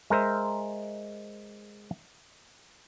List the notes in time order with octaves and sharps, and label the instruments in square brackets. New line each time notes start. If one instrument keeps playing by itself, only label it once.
[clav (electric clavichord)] G#3 A#4 C5 E5